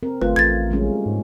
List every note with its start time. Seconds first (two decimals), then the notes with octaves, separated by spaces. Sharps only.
0.03 C4 A#4
0.21 G1 A3 F4 B4
0.36 A1 G#6 A6
0.71 G3 G#3 C#4
1.06 G#2